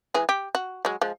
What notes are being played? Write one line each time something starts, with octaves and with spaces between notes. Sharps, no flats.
E3 G#3 G#4
G4
F#4
F#3 G#3
F3 G#3